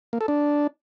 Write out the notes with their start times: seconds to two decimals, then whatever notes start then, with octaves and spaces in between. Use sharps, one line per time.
0.13 A#3
0.21 A4
0.28 D4